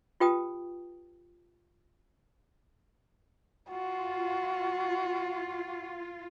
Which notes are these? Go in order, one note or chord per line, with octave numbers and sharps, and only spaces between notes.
F4 G4 B4 G5 A5 D#6
F4 F#4